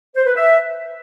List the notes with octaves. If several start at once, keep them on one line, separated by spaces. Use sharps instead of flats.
C5
B4
E5